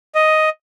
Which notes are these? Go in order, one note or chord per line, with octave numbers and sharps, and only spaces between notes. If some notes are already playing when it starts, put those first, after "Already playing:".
D#5